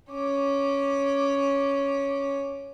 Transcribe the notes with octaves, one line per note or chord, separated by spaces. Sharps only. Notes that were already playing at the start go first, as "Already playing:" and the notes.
C#4 D6